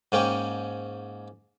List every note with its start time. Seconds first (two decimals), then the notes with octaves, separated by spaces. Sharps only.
0.12 G#2 A#3 C#4 G5